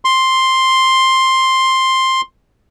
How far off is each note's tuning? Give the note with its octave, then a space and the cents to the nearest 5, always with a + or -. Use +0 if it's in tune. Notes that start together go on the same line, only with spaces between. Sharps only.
C6 +5